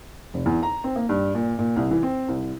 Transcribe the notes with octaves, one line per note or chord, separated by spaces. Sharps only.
F1
E2
A#5
C4
A#3
G2
A#2
A#2
C2
E3
C4
C2